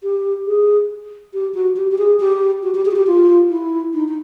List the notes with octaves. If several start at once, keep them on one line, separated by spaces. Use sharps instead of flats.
G4
G#4
G4
F#4
G4
G4
G#4
G4
F#4
G4
G#4
F#4
G4
F4
E4
D#4
D#4